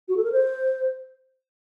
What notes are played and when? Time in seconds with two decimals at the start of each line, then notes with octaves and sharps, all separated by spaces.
0.09 F#4
0.17 A4
0.24 A#4
0.32 C5